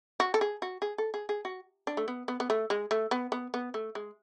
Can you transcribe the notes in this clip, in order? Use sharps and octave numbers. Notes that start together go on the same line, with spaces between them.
F#4
A4
G#4
F#4
G#4
A4
G#4
G#4
F#4
D4
A3
B3
B3
B3
A3
G#3
A3
B3
B3
B3
A3
G#3